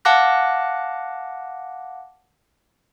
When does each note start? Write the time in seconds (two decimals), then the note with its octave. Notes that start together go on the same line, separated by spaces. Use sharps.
0.05 F5 F#5 A5 D6 F#6 A#6